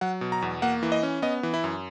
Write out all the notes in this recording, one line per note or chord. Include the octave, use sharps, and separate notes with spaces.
F#3 F#5
B2
A#5
E2
A#3 F#5
E3
D#5
C#4
B3 D#5
E3
E4
F#2